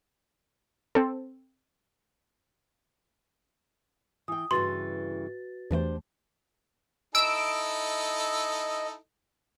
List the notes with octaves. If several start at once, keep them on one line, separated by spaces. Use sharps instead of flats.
C4 A4
E3 G5 D#6
G2 C#3 E3 F#4 B4 C6 A6
E2 E3 A3 D4 G4 C5
D#4 E4 A4 D#5 E6 D7